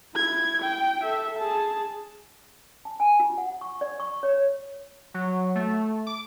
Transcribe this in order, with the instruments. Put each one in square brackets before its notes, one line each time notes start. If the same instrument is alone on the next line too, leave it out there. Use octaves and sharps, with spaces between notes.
[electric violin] E4 G#6
G5
A4 E5
G#4 A5
[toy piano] A5
G#5
F4
F#5
C#6
D5
C#6
C#5
[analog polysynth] F#3
A3
D6